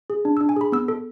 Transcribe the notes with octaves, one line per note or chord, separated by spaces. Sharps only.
G#4
D4
E6
D4
G#5
G#4 B5
B3 E6
A4